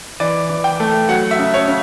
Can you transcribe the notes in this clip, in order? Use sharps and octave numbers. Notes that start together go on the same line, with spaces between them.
E3 D5
E3
G5
A3
F#3 F#5
E5
C#3
C#5
C#3